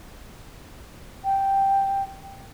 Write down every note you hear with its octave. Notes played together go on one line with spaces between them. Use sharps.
G5